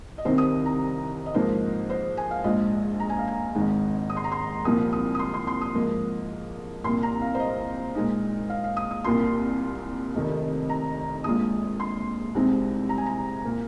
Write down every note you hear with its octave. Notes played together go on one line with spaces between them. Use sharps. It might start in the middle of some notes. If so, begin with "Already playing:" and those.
D#5
C2 C3 D#3 C4 D#4 C5
D#6
A#5
D#5
G#2 F3 A#3 D#4 C5
C5
G#5
F5
A#1 G#2 G#3 F4 D#5
A#5
G#5
F5
G#5
G#1 G#2 G#3 D#4
D#6
C6
A#5
C6
C2 A#2 F3 A#3 D#6
D#6
D#6
C6
C6
C6
D#6
G#2 F3 A#3
C2 A#2 A#3 C6
A#5
F5
C5
D#5
A#2 G#3 D#4
F5
F5
D#6
D#6
C2 A#2 A#3 F4 C6
F1 F2 C3 D#3
A#5
A#1 A#2 G#3 F4 D#6
C6
C2 C3 G#3 C4 D#4
A#5
G#5
A#5
A#2 A#3